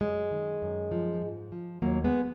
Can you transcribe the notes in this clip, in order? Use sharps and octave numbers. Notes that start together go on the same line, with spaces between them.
F#2 G#3
D#3
F#2
F3
G#2
F3
D#2 F#3 A#3
G#3 B3